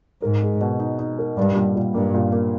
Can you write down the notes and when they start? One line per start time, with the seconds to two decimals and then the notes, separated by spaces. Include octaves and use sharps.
0.22 G#2 A#4
0.42 G#3
0.61 B2
0.79 D#4
0.99 D#4
1.19 A#4
1.37 G2 G3
1.56 A#2
1.76 A#2
1.94 G2 A#3
2.14 A#2
2.33 A#3